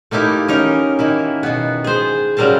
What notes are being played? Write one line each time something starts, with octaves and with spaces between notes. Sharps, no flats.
A3 A#3 D#4 E4 G4
C#4 D#4 A#4
D#3 A#3 E4
B2 B3
G#4 C5
C#3 F#3 G3 A#4 C5 A5